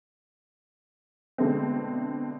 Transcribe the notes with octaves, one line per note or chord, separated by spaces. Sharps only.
B2 D3 G#3 A3 C4